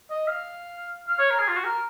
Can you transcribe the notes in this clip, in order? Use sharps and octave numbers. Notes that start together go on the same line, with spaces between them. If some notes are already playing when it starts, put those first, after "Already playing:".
D#5
F5
F5
C#5
A#4
G#4
F4
F#4
A#4